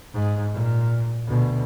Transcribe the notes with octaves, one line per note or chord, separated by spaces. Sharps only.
G#2
A#2
D2 B2